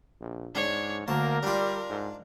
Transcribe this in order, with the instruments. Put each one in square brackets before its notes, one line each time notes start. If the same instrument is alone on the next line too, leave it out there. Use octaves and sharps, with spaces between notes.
[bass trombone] A#1
[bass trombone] G#2 [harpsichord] D4 [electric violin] C#5
[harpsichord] D2 A5 [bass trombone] A#3 [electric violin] A#4
[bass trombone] G3 [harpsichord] D4 F4
[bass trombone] G#2